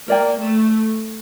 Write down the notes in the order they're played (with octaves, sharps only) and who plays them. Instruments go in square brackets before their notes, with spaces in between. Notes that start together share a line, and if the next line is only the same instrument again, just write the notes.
[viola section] A#3 [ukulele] A#4 D5 G5
[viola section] A3